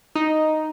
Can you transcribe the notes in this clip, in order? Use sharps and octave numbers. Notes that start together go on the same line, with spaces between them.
D#4